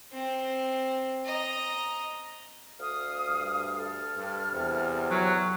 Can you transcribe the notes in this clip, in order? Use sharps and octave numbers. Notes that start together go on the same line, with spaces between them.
C4
D#5 A#5
D2 F5 D#6 F6
G2
A4 F6
G2
E2 C3
F#3